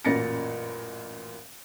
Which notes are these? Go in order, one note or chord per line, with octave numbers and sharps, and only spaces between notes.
A1 F#2 A#2 A6 A#6 C#7